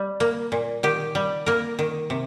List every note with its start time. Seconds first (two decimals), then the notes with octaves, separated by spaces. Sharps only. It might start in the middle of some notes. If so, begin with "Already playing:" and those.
Already playing: G3
0.20 A#3
0.52 A#2
0.83 D#3 G4
1.15 G3
1.46 A#3 A#4
1.79 D#3
2.10 C3